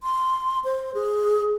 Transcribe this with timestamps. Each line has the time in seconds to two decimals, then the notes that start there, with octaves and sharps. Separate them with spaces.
0.03 C6
0.65 C5
0.94 G#4